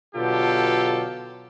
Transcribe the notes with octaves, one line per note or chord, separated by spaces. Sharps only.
B2 D3 F#3 F4 G4 A4